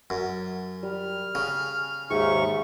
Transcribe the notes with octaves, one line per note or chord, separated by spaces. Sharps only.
F#2
G3 F6
C#3 G#5
D#2 G#2 G#4 E5 C#6